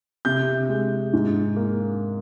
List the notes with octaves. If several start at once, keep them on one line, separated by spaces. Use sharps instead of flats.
C3 G6
G#3
G#2
A#3